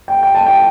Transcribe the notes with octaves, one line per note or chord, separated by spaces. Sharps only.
G5
G5
A5
G5